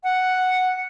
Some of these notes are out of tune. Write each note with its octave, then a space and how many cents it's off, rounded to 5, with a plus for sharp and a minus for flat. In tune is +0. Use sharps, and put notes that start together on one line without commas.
F#5 +0